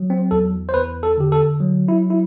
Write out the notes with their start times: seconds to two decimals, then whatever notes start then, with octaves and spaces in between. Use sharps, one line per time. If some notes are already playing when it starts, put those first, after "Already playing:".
Already playing: F#3
0.10 C4
0.31 E2 A4
0.69 C5
0.74 E2 B4
1.03 A4
1.18 D3 G4
1.32 A4
1.60 F#3
1.88 E4
2.10 E4